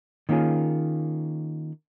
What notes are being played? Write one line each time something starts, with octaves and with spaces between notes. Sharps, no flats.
D#3 A#3 C#4 F4 G#4